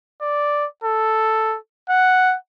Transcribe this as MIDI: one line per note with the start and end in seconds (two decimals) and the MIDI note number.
0.21 0.66 74
0.84 1.57 69
1.90 2.36 78